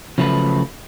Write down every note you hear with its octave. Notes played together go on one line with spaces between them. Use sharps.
C#3 F3 F#3 A3 F4 B4